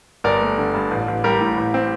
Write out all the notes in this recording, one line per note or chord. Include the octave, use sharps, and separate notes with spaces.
G1 A#4 D5
A3
D3
G2
A1
A1
G3 G4 A#4
A2
A1
C4